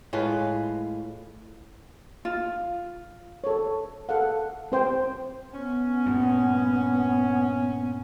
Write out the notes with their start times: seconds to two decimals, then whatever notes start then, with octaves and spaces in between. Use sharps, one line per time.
0.13 A2 G#3 F4 B4
2.25 F4
3.44 A4 C#5
4.09 A4 F5 F#5
4.72 C4 C5 G5
5.54 B3 C#4
6.06 G2 A#2